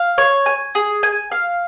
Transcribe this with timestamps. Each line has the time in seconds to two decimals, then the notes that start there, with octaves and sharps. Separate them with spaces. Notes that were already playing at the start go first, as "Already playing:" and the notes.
Already playing: F5
0.18 C#5
0.46 G#5
0.75 G#4
1.03 G#5
1.32 F5